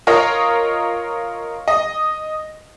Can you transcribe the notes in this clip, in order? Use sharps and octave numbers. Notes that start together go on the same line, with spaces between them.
F4 A#4 C#5 D#5
D#5